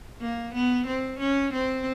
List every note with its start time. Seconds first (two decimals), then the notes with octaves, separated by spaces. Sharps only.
0.20 A#3
0.54 B3
0.86 C4
1.19 C#4
1.53 C4